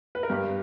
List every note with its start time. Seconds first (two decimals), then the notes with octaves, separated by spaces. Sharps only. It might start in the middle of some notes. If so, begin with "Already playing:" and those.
0.15 B4
0.23 A#4
0.30 G2 G4